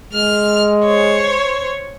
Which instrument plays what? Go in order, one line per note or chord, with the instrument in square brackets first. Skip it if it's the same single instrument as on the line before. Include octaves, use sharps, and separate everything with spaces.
[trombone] G#3 [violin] F6
[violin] C5 C#5